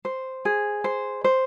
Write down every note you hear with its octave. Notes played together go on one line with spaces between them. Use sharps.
C5
G#4
C5
C5